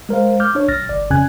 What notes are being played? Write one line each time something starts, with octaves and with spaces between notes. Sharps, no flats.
G#3 A#4 C5 F5
D6 F6 G6
D4 C#5
B1 F6 A6 A#6
G1 D5
F2 C#3 C#4 G#5 F#6 G#6